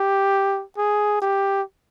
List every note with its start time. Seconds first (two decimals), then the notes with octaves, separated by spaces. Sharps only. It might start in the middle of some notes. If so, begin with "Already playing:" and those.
Already playing: G4
0.77 G#4
1.22 G4